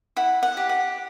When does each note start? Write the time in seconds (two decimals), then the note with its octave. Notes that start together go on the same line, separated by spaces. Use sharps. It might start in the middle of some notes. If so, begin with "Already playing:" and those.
0.16 E4 F#5
0.43 F#5
0.57 G4
0.69 F#5